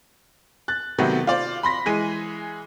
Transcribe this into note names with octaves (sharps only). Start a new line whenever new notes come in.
F#6 A6
C3 D#3 F#3 A3 B3
F4 C5 D5
B5 C6 A#6 B6
E3 G#3 G#4 D#7